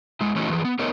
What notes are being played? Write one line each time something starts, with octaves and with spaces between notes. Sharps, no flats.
G#3 E4
E3 A3 C#4 D#4 E4 F#4
E3 F3 G#4
B3
A3 B3 D#4 A#4 C#5 D#5